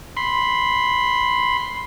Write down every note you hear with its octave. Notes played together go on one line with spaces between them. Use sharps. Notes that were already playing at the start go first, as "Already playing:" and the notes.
B5 C6